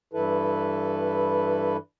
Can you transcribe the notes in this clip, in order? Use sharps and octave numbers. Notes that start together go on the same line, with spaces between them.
G2 E3 E4 A4 B4